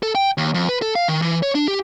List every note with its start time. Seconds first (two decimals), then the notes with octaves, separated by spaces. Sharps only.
0.03 A4
0.15 G5
0.38 D#2
0.54 F2
0.69 B4
0.82 A4
0.95 F5
1.08 D#3
1.22 E3
1.43 C#5
1.55 D4
1.68 G4